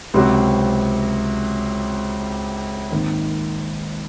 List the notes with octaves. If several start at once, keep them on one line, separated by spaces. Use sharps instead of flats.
C#2 C3 F#3 C4 F#4
G#1 G#2 D#3 A#3